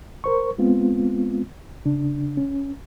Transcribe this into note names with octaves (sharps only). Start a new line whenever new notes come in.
A#4 C5 C#6
G#3 B3 C4 F4
C#3 D4
C#4